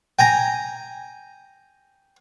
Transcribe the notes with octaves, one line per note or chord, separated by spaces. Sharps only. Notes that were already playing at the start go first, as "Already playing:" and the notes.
G5 G#5 A#5